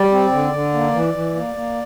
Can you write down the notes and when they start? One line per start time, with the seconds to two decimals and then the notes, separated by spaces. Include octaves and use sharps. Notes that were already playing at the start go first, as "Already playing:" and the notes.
Already playing: G3 D5
0.12 C4
0.32 D3
0.52 D3
0.74 A#3
0.94 E3
1.14 E3
1.35 A#3
1.55 A#3